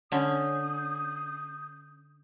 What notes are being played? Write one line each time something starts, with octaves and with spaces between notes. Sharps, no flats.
D3 C#4 D#6 G6